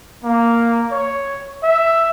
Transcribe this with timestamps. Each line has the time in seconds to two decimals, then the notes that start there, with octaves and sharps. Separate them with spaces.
0.24 A#3
0.92 C#5
1.63 E5